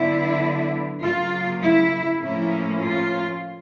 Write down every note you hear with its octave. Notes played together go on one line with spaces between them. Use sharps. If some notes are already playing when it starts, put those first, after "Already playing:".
Already playing: D3 F#3 B3 D4 E4
C#3 F#3 A#3 F4
E4
A2 F3 A#3 C#4 E4
F4